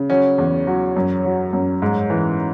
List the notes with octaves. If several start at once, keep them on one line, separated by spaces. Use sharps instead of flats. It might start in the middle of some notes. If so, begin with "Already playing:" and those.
Already playing: C#3
F#3 C#4
E2
F#3
F#2
F#3
F#2
G#2
E3